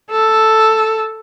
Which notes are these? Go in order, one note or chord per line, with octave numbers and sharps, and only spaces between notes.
A4